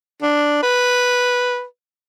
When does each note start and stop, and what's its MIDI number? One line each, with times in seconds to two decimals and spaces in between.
0.22 0.62 62
0.63 1.64 71